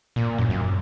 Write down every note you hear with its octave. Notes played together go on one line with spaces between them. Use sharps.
A#2
F#2
F#2